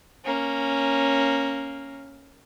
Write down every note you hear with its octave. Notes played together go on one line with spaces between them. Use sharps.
A#3 C#4